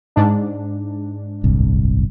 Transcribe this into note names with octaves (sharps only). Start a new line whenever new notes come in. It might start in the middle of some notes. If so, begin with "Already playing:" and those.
G#2 D4
D1 G1 C2